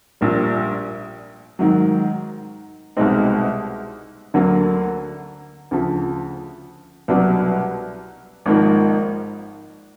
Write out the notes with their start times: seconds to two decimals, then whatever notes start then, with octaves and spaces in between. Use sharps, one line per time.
0.21 A#1 A#2 G3
1.59 G#2 D#3 F#3
2.97 C2 B2 G#3 C4 D#4
4.34 D2 D3 F#3 A#3
5.71 D2 C#3 F3
7.08 C2 B2 F#3 B3 D4
8.46 G#1 G#2 F3 A#3 D#4